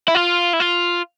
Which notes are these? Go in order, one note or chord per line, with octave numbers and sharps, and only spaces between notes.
E4
F4
E4
F4